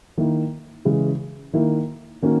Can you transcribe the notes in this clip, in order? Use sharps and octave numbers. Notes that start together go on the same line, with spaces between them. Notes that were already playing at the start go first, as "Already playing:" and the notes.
D#3 A#3 E4
C#3 E3 G#3 C#4
D#3 A#3 E4
D#3 A#3 C#4 F#4